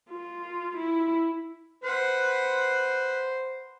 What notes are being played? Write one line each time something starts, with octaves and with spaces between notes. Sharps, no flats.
F4
E4
B4 C5 F#5